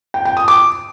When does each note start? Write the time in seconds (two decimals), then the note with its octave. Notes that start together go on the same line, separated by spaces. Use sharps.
0.14 G5
0.25 G5
0.37 D#6
0.48 D6